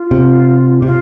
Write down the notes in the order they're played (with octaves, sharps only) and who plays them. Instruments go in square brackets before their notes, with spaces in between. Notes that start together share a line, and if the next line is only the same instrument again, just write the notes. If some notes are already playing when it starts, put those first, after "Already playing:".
Already playing: [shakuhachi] F4
[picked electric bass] C3
[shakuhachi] G4
[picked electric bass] C3
[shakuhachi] F4